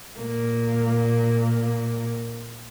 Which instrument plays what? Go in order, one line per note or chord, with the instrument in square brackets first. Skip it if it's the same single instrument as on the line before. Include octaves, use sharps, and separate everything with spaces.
[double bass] A#2 A#3